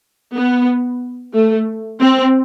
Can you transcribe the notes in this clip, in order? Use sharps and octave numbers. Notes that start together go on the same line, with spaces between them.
B3
A3
C4